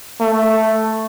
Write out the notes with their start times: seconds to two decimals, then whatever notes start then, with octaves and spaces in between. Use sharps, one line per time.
0.21 A3